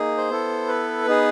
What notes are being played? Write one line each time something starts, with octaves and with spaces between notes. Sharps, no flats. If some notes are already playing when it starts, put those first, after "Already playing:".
Already playing: A#3 D#4 G#4
C5
B3 E4 A4
B4
B3 D#4 G#4